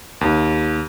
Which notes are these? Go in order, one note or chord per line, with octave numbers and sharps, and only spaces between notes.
D#2